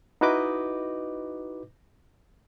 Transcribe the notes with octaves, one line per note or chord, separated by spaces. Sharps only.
D#4 E4 F#4 B4 D#5 D6